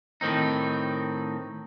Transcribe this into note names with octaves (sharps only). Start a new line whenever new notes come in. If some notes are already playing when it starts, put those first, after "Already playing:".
A2 D#3 C4 D#4